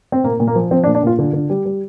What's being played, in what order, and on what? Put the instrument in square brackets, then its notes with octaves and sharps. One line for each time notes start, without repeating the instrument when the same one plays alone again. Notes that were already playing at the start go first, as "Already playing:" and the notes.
[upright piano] C4
A#2 A#3
A#2
A#3
F3
F3 C4
D4
A#2
D4
A#2 F4
D3 F4
D3
G3
G3